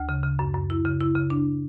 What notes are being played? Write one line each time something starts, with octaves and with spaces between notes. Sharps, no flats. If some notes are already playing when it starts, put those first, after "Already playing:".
Already playing: D2
C#3
C#3
F#2
F#2
E4
C#3
E4
C#3
D4